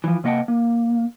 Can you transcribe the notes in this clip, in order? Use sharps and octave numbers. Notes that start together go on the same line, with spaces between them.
E3 F3
C3 A#3 D#5 F#5 G5 A5
A#3